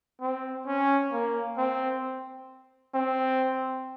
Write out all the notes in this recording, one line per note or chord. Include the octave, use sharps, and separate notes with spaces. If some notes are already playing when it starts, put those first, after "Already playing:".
C4
C#4
A#3
C4
C4